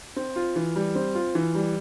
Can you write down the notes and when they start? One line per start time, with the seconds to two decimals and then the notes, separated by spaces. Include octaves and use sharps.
0.16 C4
0.36 F4
0.56 E3
0.76 G3
0.95 C4
1.15 F4
1.35 E3
1.55 G3